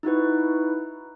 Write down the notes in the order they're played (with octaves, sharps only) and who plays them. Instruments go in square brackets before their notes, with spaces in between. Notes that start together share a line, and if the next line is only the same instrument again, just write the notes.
[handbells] D#4 E4 F#4 B4